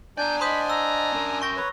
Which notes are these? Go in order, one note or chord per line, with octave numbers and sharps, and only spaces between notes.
D4 D5 G#5 A#5 G6
C5 D#5 B5 C6 D#6 G6
A#5 E6
C#4 A#4
G5 C#6 A#6
B4 C#5 A#5